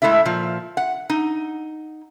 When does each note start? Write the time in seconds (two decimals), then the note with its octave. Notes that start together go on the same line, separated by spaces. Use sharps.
0.02 A2 G#3 A3 E4 E5
0.25 A#2 F3
0.77 F#5
1.10 D#4